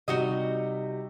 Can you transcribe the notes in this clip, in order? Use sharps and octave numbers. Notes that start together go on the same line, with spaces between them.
C3 G3 D#4 F#4 D#5 G7